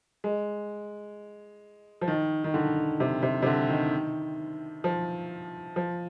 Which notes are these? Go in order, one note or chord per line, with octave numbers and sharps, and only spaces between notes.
G#3
F3
D#3
D#3
D3
C3
C3
C3
D3
D#3
F3
F3